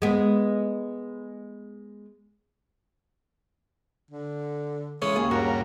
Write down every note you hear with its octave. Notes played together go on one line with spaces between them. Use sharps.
G#3 B3
D3
C#3 E3 G#3 C#4 C#5
D#2 G#4
G2 F#4 A#4